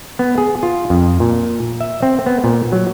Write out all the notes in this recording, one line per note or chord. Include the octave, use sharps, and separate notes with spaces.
B3
G#4
F4
F2
A#2
E5
C4
B3
A#2
F#3